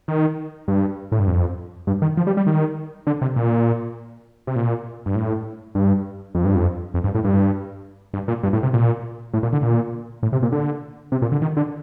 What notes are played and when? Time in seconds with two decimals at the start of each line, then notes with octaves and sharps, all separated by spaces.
0.08 D#3
0.68 G2
1.12 A2
1.19 G2
1.28 F2
1.87 G2
2.02 D#3
2.17 F3
2.27 G3
2.37 G3
2.47 D#3
3.07 D3
3.22 C3
3.36 A#2
4.47 C3
4.56 A#2
5.06 G2
5.15 A2
5.75 G2
6.35 F2
6.45 G2
6.55 F2
6.94 F2
7.04 G2
7.15 A2
7.24 G2
8.14 G2
8.28 A#2
8.43 G2
8.53 A2
8.63 C3
8.73 A#2
9.33 A2
9.43 A#2
9.53 D3
9.62 A#2
10.23 A2
10.32 C3
10.42 A#2
10.52 D3
11.12 C3
11.22 A#2
11.32 D3
11.42 D#3
11.57 D3